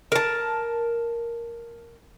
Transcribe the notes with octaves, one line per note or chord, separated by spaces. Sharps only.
A#4 A5